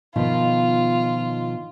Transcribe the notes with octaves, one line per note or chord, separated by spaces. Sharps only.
B2 D#3 F3 F4